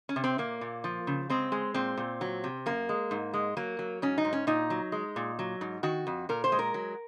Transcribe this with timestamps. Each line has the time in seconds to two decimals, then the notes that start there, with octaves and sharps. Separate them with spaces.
0.09 C#4
0.16 C3
0.24 C4
0.38 A#2 A#3
0.61 A#2
0.84 F3
1.07 C#3
1.30 G#3 C4
1.52 G#3
1.74 A#2 C4
1.97 A#2
2.21 F#3
2.44 C3
2.66 F#2 A#3
2.89 G#3
3.11 G#2
3.34 G#3
3.57 F#3 A#3
3.79 F#3
4.02 G#2 C#4
4.18 D#4
4.25 G#2
4.33 C#4
4.47 A#2 D#4
4.70 F#3
4.92 G#3
5.16 A#2
5.39 F#3
5.61 G#2
5.83 D#3 F#4
6.07 F2
6.29 A#2 A#4
6.44 C5
6.52 G#3
6.59 A#4
6.74 F#3